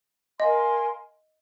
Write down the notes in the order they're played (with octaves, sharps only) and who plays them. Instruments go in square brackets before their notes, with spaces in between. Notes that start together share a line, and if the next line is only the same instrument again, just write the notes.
[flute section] A#4 F5 G#5 C6 [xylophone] D#5